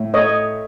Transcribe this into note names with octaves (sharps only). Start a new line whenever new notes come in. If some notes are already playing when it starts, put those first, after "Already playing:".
Already playing: A2
A3 C#5 D#5